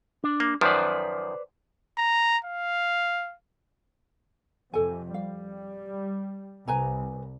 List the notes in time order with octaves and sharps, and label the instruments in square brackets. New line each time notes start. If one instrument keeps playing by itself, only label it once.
[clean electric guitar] D4
[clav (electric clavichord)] A#3
[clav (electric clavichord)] F#2 D#3 F3 [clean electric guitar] B4 C5 D5
[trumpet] A#5
F5
[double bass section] F2 C3 [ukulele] A4 G#5
[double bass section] G3 [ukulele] F5
[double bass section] C2 [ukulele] B4 G#5 A#5